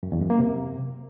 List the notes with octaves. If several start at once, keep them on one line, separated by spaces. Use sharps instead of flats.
F#2
E2
F#2
A#3
C3